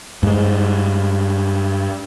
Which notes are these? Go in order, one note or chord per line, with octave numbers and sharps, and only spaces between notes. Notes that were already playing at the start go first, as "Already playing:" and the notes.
G2 G#3